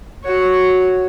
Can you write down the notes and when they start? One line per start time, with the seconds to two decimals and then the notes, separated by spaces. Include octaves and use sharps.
0.23 F#4 C#5